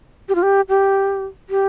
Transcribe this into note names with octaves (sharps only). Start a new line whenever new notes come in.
G4
F4
G4
G4
G4